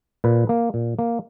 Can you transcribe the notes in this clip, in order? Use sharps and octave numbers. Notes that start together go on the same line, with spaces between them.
A#2 B4
A#3
A#2
A#3